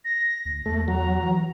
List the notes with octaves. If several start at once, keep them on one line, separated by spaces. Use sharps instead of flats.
A#6
D2 A#6
E2 A3
F#3 A#5
E3